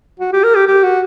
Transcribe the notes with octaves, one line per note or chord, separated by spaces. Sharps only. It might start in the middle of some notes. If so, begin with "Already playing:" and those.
F#4
G4
A#4
G4
G4
F#4